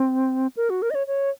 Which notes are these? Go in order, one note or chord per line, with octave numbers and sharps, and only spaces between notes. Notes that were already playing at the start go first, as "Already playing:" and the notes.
Already playing: C4
A#4
F#4
A#4
D#5
C#5
C#5